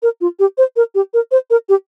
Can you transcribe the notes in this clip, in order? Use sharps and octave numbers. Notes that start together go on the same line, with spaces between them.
A#4
F4
G4
C5
A#4
G4
A#4
C5
A#4
G4